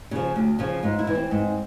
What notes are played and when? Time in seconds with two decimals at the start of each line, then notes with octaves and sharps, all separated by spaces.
0.11 C#3 F3
0.36 D2
0.59 C#3 F3 F4
0.83 G#2 F4
0.99 E4
1.07 E3
1.15 C4
1.31 G#2